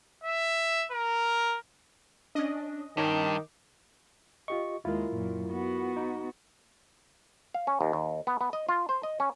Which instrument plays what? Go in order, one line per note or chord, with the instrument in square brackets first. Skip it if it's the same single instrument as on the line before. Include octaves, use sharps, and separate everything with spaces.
[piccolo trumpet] E5
A#4
[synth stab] C#4 D#5 [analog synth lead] D4
[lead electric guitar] G2 [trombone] D#3 [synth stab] C#4 D#4 [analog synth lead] D6
[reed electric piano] F4 G4 D#5 [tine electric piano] C#6
[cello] D#2 G#3 [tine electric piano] E4 A#4 [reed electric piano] F4
[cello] F#2 A#2
B3 F#4
[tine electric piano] D#4
[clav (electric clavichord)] F5
C#4
D#2
D#2
B3
B3
D#5
F4
C5
D#5
C#4